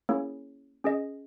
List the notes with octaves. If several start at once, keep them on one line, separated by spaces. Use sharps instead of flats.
A#3 C#4 E4 G#4 C#5
C#4 G#4 D#5